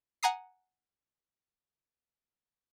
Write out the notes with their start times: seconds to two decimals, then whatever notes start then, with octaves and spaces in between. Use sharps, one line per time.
0.23 F#5 G#5 A#5 D#6 C7